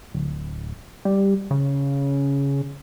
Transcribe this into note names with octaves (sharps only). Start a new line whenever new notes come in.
D1
G3
C#3